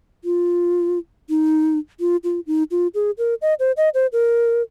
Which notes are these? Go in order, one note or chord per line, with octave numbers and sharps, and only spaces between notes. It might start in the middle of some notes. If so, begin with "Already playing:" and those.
F4
D#4
F4
F4
D#4
F4
G#4
A#4
D#5
C5
D#5
C5
A#4